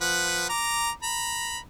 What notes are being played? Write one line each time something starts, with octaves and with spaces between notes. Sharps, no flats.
F3 B4 F#5
A#5 D6
A#5 B5